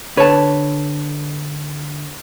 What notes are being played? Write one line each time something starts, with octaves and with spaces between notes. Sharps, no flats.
D3 B4 C#5 A5